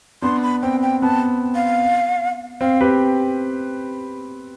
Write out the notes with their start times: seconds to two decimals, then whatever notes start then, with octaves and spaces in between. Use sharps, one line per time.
0.22 B3 D4 C6
0.43 B5
0.62 C4 G5
0.82 G5
1.02 B3 A5
1.55 F5
2.61 C4 F5
2.81 G4 B4